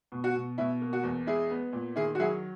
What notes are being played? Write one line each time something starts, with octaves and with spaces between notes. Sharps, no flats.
B2
F#4
B2
B2 E4
A#3
F#4
E2
G#3 E4 G#4
B3
A#2
D#3 E4 G#4
F#4
F#3 E4 G#4